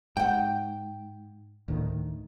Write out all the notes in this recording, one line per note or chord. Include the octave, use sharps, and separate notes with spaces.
G#2 F#5 G5
D2 A2 D#3